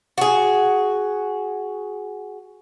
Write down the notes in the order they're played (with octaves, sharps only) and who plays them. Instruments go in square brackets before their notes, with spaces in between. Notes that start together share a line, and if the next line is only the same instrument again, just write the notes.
[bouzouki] F#4 G#4